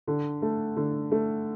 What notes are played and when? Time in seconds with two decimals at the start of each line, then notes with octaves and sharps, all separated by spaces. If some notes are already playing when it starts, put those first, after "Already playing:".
0.08 D3
0.42 A3
0.76 D3
1.12 A3